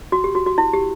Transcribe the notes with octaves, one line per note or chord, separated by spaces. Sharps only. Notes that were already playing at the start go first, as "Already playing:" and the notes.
F#4
G4
F#4
F#4
E4
G4